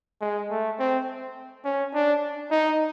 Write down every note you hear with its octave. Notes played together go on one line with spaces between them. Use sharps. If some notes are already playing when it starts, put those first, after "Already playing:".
G#3
A3
C4
C#4
D4
D#4